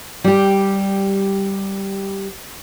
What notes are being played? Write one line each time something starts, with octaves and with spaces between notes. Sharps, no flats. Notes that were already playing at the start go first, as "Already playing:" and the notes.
G3 G4